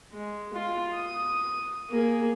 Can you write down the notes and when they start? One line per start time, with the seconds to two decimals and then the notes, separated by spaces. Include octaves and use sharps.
0.13 G#3
0.54 F4
0.95 D#6
1.89 A#3 G#4